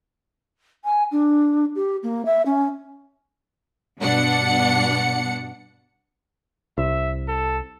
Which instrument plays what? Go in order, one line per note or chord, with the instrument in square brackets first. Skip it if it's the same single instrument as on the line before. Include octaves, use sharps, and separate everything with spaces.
[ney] G#5
D4
G4
A#3
E5
C#4
[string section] G2 B2 D4 F#5 C#7
[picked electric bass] C2 [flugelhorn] E5
[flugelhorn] A4